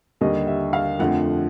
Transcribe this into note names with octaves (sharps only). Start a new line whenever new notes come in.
D#2 D3 G3 D#5
E5
F5
F2 D3 F3 A3 F#5